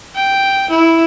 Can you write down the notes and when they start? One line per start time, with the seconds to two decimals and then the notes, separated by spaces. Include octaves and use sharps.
0.15 G5
0.70 E4